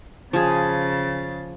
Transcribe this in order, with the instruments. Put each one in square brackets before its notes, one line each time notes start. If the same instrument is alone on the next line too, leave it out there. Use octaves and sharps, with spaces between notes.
[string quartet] C#3 A6 [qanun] F3 G#4